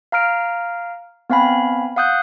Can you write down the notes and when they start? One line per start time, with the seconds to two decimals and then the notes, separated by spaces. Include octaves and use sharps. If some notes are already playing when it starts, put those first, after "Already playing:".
0.12 F5 A#5 F6 D7
1.30 B3 C4 F5 G#5 B5
1.96 F5 F#5 D#6 F#6 G6